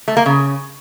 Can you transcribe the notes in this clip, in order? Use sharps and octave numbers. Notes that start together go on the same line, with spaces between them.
A3
A#3
C#3